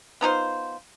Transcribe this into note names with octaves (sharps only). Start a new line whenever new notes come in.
B3 D#4 F4 C5